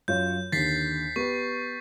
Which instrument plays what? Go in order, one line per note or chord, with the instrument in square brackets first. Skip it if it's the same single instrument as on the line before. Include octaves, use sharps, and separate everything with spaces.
[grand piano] F#2 F4 C#5 [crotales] G6
[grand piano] D#2 D3 [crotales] A6 B6 C7
[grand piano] B3 G4 B4 [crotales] C#6